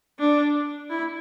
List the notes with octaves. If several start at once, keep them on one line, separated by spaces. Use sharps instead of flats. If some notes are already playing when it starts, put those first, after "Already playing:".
D4
E4